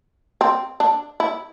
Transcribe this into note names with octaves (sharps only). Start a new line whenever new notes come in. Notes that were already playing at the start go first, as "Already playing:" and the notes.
C4
D4
E4